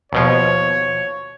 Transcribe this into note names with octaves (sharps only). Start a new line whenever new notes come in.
D#2 B2 F3 C#5